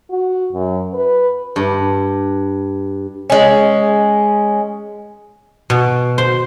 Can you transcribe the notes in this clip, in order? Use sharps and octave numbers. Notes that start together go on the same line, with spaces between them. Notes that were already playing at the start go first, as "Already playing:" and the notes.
F#4
F#2
B4
G2
G#3 C#4
B2
C5